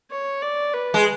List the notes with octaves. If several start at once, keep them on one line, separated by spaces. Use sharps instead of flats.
C#5
D5
B4
G#3